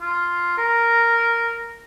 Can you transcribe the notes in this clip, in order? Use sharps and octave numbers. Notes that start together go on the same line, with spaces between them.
F4
A#4